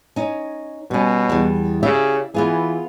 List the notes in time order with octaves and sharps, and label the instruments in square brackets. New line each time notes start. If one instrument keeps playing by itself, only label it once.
[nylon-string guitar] C#4 D#4
[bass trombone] B2 [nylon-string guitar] G3 C#4
[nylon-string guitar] E2 G3
[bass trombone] C#3 [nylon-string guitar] G4 D5 E5
[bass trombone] E3 [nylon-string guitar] B3 F4 G#4